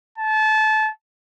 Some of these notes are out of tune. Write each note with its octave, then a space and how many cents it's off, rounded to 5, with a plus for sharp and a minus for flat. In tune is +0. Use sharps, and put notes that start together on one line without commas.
A5 -25